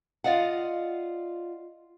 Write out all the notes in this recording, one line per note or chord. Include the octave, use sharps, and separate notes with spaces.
F4 D5 D#5 F5 F#5